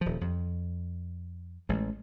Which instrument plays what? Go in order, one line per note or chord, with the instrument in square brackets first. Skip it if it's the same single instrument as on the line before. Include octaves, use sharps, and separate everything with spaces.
[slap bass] D#1 F3
F2
A1 G#3